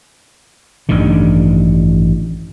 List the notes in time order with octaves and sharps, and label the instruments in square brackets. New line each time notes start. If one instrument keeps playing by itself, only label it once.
[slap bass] A1 G2 D3 D#3